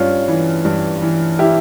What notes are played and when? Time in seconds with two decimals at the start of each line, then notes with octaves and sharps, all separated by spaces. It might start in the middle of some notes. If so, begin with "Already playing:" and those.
Already playing: G2 C#4 F4
0.28 E3
0.65 G2
1.02 E3
1.39 E4 G4